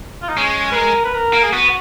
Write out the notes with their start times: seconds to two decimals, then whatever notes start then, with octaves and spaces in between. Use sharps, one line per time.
0.23 F4
0.29 D#4
0.37 G#3 C#4
0.72 B4
0.76 A#4
1.05 B4
1.15 A#4
1.33 A#3
1.43 G#4
1.52 B3 F#4